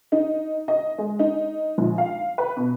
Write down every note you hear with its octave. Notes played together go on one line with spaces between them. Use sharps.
D#4
D#5
G#3
D#4
A#1
F5
B4
B2